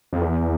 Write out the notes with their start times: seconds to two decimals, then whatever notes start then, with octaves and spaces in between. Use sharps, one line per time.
0.13 F2
0.21 E2